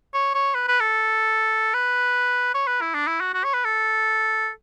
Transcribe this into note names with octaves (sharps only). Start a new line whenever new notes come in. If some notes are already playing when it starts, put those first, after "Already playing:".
C#5
C#5
B4
B4
A4
B4
C#5
B4
E4
D4
E4
F#4
F#4
C#5
B4
A4